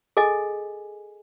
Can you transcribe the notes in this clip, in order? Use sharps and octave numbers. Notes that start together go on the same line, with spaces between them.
G#4 A4 D#5 G#5